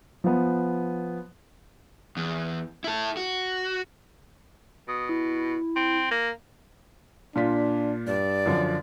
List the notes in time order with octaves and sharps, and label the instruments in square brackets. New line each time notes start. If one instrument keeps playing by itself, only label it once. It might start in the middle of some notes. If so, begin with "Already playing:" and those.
[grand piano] F3 B3
[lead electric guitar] E2
E4 A4
F#4
[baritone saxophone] B2 [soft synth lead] D#6
[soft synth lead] E4
[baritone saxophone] C4
A#3
[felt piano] A#2 F4 B6 [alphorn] D4
[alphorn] G2 [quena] D5
[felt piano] F#2 D3 F3